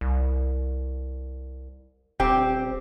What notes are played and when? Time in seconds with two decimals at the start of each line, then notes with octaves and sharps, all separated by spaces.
0.01 C2
2.20 D#1 C4 G4